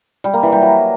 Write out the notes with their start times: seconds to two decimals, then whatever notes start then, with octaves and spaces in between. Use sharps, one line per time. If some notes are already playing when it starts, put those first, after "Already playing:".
0.24 G3
0.34 A#3
0.43 E3
0.52 G3
0.62 F#3